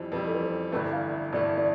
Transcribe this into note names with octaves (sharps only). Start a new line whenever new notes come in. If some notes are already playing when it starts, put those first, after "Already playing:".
Already playing: F2 E3 G3 C5
F2 E3 G3 B4
A4
B4
C5
G1 G2 E3 A3 B4
F5
E5
G1 G2 E3 A3 D5
D5